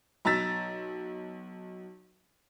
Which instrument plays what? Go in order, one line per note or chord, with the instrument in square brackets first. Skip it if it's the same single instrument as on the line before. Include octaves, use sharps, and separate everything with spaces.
[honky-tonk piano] B1 A#5 E6 A6 B6